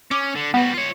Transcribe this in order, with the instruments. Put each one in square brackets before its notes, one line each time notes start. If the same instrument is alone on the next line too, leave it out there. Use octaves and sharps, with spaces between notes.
[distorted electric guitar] C#4 [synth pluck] D6
[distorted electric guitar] D3
[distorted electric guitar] G3 F#4 [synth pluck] B3
[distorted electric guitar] F4 C#5